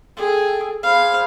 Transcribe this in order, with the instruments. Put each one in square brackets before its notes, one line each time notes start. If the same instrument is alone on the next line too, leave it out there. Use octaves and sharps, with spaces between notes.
[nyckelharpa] G#4 [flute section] A4 G5
[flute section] G#4 C5 B5 [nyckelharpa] F5